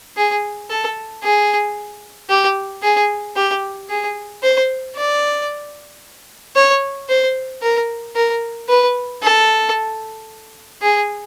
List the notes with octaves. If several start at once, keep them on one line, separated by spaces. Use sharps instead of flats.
G#4
A4
G#4
G4
G#4
G4
G#4
C5
D5
C#5
C5
A#4
A#4
B4
A4
G#4